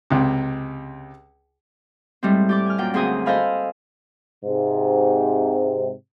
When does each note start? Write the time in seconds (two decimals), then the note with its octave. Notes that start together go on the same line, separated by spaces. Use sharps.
0.10 C#2 C3
2.23 A2 G3 G#3 C4
2.49 G4 D5 D6
2.66 G#5 F6
2.78 F#2 A#2 G5
2.94 D2 C4 G#4 C5 G#5 D#6
3.26 A4 C5 D#5 F5 G#5 B5
4.45 G#2 C3